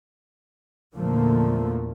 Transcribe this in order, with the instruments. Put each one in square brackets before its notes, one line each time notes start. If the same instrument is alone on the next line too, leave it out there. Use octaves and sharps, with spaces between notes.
[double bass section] E2 A#2 D3 F3 A3 A#3